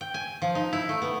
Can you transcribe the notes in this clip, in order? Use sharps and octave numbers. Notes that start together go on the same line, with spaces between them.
G5
G#5
F3
D#4
E4
A3
B3